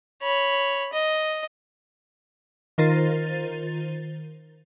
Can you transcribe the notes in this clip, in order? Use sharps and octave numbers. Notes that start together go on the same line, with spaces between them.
C#5 B5
D#5
D#3 F4 A#4 C5 A6 D#7